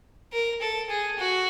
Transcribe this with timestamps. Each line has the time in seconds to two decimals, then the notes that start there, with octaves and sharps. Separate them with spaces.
0.33 A#4
0.61 A4
0.90 G#4
1.19 F#4